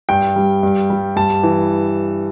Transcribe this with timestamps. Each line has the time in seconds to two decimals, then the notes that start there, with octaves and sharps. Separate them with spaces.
0.09 G2 G5
0.36 G3
0.63 G2
0.90 G3
1.16 G2 A5
1.43 E3